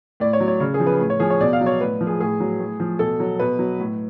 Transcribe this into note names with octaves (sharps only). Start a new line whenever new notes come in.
A2 D5
C#5
F#3
C#5
C#3
G#4
F3
B4
A2
C#5
F3 G#4
C#5
B2 D5
F5
F#3
C#5
A2 B4
F3
G#4
A2 G#4
F#3
A2
F3
B2 A4
F#3
B2 B4
F#3
A2